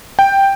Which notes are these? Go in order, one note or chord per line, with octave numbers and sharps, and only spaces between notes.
G5